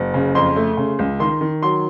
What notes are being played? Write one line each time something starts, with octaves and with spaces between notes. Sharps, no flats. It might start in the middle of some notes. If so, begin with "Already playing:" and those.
Already playing: F#1
C#3
F2 C6
A3
C#3
C#2
D#3 C6
D#3
F#3 C6